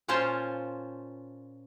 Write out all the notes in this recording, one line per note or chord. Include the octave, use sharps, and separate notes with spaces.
A#2 C#4 F4 C5 C#5 A5